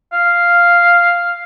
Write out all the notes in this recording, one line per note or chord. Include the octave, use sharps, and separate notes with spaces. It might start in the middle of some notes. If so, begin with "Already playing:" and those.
F5